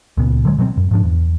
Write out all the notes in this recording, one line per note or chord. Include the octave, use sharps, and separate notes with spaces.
C#2 A#2 C#3 B3
D3 F#3 G#3
B2 F#3 G3 C4
F#2
G#2 F3 D4
E2